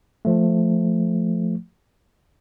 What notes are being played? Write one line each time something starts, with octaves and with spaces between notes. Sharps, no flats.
F3 A3